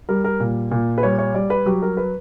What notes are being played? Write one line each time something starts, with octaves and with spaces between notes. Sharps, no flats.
G3 A#4
A#4
A#2
A#2
B4
G3 C#5
C#5
G3 D5
B4
F#3 G4
A#4
B4